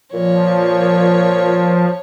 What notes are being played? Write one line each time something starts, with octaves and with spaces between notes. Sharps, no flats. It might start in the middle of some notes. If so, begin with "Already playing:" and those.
A#2 F3 C#5